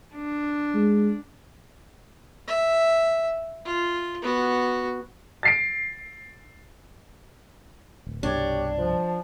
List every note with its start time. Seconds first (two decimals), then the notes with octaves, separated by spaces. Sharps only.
0.15 D4
0.74 G#3
2.47 E5
3.65 F4
4.22 B3 F#4
5.43 A6 C7 D7
8.07 D1
8.23 C2 G2 B2 D4 G4 C#5
8.78 F3